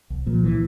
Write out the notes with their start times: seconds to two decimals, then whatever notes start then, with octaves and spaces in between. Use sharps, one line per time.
0.10 C2
0.26 A#2 F3
0.44 E3